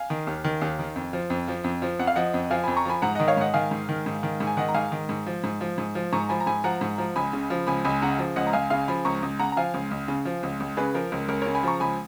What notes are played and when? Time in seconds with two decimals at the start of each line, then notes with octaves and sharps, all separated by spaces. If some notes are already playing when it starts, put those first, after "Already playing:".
Already playing: F5 G#5
0.10 D#3
0.27 D#2
0.44 D#3
0.61 D#2
0.79 D#3
0.96 F2
1.13 F3
1.30 F2
1.48 F3
1.64 F2
1.82 F3
1.99 F2 F#5
2.07 F5
2.16 F3 D#5 F#5
2.34 F2
2.50 F3 F5 G#5
2.64 F2 G#5 B5
2.77 A#5 C#6
2.85 F3 G#5 B5
3.02 G#2 F#5 A#5
3.15 D#3 D#5 F#5
3.28 C#5 F5
3.37 G#2 D#5 F#5
3.54 D#3 F5 G#5
3.71 G#2
3.89 D#3
4.06 G#2
4.23 D#3
4.40 G#2
4.47 G#5
4.57 D#3 D#5 F#5
4.69 A#5
4.75 G#2 F5 G#5
4.92 D#3
5.09 G#2
5.26 F3
5.44 G#2
5.61 F3
5.78 G#2
5.95 F3
6.13 G#2 A#5 C#6
6.29 F3 G#5 B5
6.40 A#5
6.47 G#2 G#5 B5
6.64 F3 F#5 A#5
6.81 G#2
6.98 F3
7.16 C#2 G#5 B5
7.33 C#3
7.50 F3
7.67 C#2 G#5 B5
7.84 C#2 G#5 B5
8.02 C#3 F#5 A#5
8.19 F3
8.36 C#2 D#5 F#5
8.47 A#5
8.53 C#2 F5 G#5
8.70 C#3 F5 G#5
8.88 F3 G#5 B5
9.05 C#2 A#5 C#6
9.23 C#2
9.39 C#3 F#5 A#5
9.52 A#5
9.57 F3 F5 G#5
9.74 C#2
9.91 C#2
10.08 C#3
10.25 F3
10.43 C#2
10.60 C#2
10.77 C#3 G#4 B4
10.94 F3 A#4
11.12 C#2 A#4
11.28 C#2 A#4
11.42 C#3 A#4 C#5
11.55 G#5 B5
11.63 F3 A#5 C#6
11.80 C#2 G#5 B5